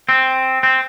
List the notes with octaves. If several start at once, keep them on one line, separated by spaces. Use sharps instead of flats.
C4
C4